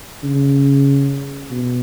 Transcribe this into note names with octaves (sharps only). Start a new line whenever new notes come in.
C#3
B2